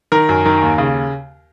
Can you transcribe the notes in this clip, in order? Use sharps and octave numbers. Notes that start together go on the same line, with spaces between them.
D#3 A#4
F#2
D#3
D#2
C#3